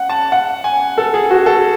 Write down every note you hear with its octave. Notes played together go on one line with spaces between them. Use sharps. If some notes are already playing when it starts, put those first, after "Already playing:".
Already playing: F#5
A5
F#5
G#5
A4
G#4
F#4
A4